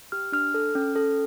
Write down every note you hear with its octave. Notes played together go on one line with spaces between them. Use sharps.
G4 F6
D4 F6
A4
C#4
A4